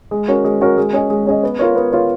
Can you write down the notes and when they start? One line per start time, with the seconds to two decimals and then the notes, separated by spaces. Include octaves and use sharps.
0.11 G#3
0.28 C#4 F#4 A#4
0.44 G#3
0.61 C#4 F#4 A#4
0.77 G#3
0.93 C#4 G#4 D#5
1.10 G#3
1.26 C#4 G#4 D#5
1.43 B3
1.59 F4 A#4 C#5
1.75 B3
1.92 F4 A#4 C#5